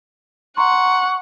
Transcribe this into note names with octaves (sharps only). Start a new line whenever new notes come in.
F#5 A#5 C6 C#6